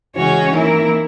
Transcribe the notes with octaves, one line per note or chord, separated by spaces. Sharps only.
C#3 E3 G#3 C#4 F#4 C#5
D#3 E3 A#3 E4 A#4